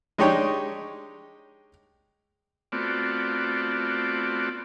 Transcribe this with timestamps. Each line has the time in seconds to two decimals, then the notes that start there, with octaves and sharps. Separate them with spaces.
0.18 G#3 D4 D#4 G4 C#5 G5
2.72 A3 B3 C4 F4 F#4 D5